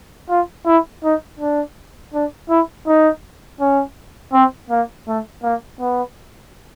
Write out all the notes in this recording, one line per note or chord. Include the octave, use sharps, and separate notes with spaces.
F4
E4
D#4
D4
D4
E4
D#4
C#4
C4
A#3
A3
A#3
B3